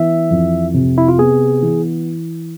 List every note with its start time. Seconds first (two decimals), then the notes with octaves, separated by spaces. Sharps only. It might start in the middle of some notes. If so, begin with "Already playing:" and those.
Already playing: E3 B3 E5
0.31 F2
0.74 C3
0.98 E4
1.08 F4
1.18 B3 G#4
1.62 E3